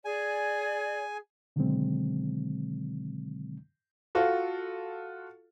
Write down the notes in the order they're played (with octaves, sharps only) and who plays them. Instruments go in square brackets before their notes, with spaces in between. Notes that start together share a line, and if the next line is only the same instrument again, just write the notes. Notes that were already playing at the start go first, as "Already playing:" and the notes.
[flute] G#4 [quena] D5 [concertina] G#5
[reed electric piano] B2 D3 D#3 F#3 G#3 C4
[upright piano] F4 F#4 A4